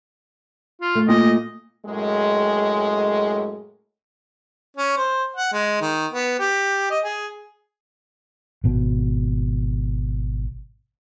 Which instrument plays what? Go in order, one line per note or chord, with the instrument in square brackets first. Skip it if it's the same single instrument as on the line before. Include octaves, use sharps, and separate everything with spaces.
[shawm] F4
[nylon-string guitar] A3
[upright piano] A#2 [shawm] D#5
[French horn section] F#2 A2 G#3
[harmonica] C#4
C5
F#5
G#3
D#3
B3
G4
D#5
G#4
[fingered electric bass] G#1 B2